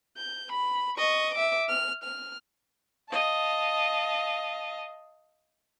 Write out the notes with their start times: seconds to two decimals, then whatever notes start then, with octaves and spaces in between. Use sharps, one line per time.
0.17 G6
0.52 B5
0.97 D#5 C#6
1.34 E5 D6
1.69 F6
2.04 F6
3.09 D#5 F5 A5